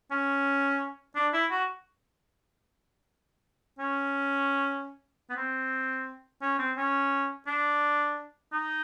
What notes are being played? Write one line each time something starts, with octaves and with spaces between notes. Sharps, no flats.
C#4
D4
E4
F#4
C#4
B3
C4
C#4
C4
C#4
D4
D#4